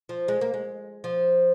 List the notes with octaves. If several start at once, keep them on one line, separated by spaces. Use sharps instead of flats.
F3
G#3
A#3
G#3
F3